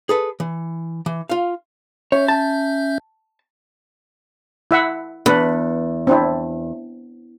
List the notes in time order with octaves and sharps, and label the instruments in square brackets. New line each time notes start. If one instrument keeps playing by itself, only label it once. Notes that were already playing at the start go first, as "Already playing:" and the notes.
[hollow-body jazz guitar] G#4 A4 B4
E3
E3
F4 F5
[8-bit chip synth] C#4 E5 G6 [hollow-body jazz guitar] C#5
[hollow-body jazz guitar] A5
[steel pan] E4 E5 F#5
[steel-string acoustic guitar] E2 [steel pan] D4 B4
[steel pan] C4 D4 E4